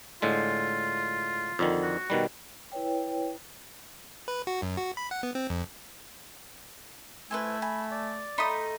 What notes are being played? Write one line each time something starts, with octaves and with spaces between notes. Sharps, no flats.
A2 D3 G#3 F4
F2 D3 D#3
F#4
B2 D#3 G3
E4 B4 C#5 G5
B4
F#4
F#2
F#4
B5
F#5
B3
C4
F2
A3 E4 B4 C5 G#5
G#5 B5
D5
A3 D#4 B5 C6 D#6